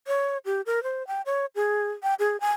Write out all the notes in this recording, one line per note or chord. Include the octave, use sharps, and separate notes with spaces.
C#5
G4
A#4
C5
G5
C#5
G#4
G5
G#4
G#5